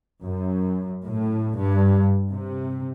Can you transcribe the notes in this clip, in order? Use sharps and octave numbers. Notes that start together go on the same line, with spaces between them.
F#2
A2
G2
C3